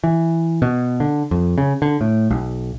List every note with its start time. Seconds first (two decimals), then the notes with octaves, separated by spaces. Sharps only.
0.04 E3
0.62 B2
1.00 D3
1.31 F2
1.58 C#3
1.82 D3
2.01 A2
2.30 B1